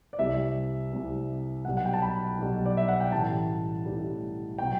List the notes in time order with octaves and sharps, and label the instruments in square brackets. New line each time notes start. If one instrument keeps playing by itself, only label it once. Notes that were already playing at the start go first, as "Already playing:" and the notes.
[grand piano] D5
C2 C3 G3 E5
C2 C3 G3
B1 B2 G3 F#5
F#5
G5
A5
B5
B1 B2 G3
D5
E5
F#5
G5
A1 A2 E3 G3 A5
A1 A2 E3 G3
B2 F#3 G5